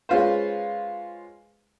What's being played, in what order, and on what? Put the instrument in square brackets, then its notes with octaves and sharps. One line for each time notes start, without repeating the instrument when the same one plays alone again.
[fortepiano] G#3 C#4 F4 B4 C5